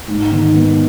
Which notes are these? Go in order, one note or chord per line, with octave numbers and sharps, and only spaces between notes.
G#2
D#3
B3